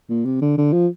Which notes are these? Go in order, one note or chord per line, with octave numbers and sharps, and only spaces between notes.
A#2
C3
D3
D3
F3